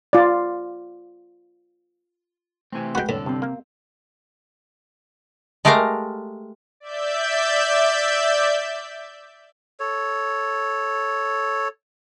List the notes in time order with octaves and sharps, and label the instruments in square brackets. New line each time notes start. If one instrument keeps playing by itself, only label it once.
[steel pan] F4 D5
[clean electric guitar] C3 E3 C4 [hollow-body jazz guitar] A3 G#5
[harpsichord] G#3 F#4 [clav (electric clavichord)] B4 F#5 G5
[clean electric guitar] C2 D3 A4 [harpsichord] A2
[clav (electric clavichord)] G2 [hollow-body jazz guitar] C3 C4
[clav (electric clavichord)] A#3
[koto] G#3 A3 G4 A#4 F5 A#5
[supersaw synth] D5 E5 G6
[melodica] A4 C#5